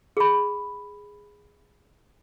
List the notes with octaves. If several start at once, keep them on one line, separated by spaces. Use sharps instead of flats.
G#4 B5